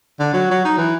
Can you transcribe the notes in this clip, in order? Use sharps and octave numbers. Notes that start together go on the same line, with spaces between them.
D3
F#3
F#3
D#4
E3